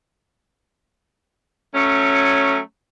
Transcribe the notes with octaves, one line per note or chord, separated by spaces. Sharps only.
F#3 A3 C#4